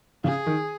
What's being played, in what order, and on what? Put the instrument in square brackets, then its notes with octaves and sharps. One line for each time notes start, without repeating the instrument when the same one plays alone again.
[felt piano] C#3 [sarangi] G#4
[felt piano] D#3